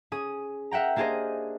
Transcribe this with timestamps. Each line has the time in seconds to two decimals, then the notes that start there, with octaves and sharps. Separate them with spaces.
0.12 C#4 G#4 D#6
0.71 A#4 E5 F#5 G5 A#5
0.96 A#3 D4 G4 G#4 C5 D#5